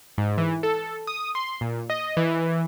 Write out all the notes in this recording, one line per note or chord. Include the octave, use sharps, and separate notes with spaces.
G#2
E3
A4
D#6
C6
A#2
D#5
E3